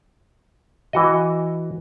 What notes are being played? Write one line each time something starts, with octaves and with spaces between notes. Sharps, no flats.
E3 F#4 D#5